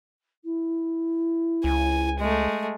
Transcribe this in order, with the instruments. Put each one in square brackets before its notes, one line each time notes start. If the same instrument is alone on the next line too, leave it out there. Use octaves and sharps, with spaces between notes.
[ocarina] E4
[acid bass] C#2 [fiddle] G#5
[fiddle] G#3 A3